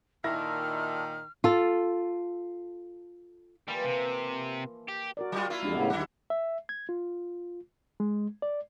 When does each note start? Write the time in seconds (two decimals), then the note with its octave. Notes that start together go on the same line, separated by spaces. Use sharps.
0.24 A#2 D#3 D4 E4 F4 A4 F6 A#6
1.44 F4 A4
3.68 E3 F3 G3 A#3
3.84 C3
4.89 G4
5.17 F#4 A#4 D5
5.32 F#3 G3 F4
5.50 A#3 E4 F4
5.63 F2 G#3 D4 G4
5.75 A2 C#3 B3 E5
5.90 D#2 F#3 E4 F#5
6.30 E5
6.69 G#6
6.89 F4
8.00 G#3
8.42 D5